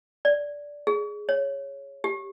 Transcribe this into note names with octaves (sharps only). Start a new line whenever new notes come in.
D5
G#4
C#5
G4